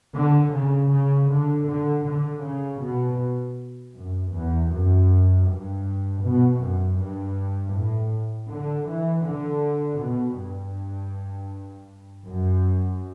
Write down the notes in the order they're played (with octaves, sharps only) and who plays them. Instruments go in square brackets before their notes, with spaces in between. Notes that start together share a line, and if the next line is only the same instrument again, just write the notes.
[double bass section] D3
C#3
C#3
D3
D3
D3
C#3
B2
F#2
E2
F#2
G2
B2
F#2
G2
A2
D3
E3
D3
B2
G2
F#2